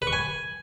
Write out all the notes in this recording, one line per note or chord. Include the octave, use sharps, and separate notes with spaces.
B4
C#6
G#5